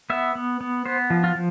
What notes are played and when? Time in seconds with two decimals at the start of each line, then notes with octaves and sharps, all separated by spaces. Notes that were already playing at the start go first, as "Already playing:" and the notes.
0.10 B3 E5
0.35 B3
0.61 B3
0.86 B3 C5
1.10 F3
1.24 F4
1.35 F3